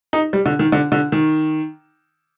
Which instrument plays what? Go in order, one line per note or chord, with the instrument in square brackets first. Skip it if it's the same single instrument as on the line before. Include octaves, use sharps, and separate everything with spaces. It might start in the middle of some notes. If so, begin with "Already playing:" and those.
[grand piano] D#4
G3
D3
D#3
D3
D3
D#3